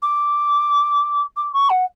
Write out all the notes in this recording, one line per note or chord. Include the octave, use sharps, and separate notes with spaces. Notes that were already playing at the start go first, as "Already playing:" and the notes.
D6
D6
C#6
F#5